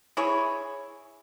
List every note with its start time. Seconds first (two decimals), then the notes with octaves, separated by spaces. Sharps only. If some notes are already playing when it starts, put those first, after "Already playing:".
0.17 E4 G#4 C#5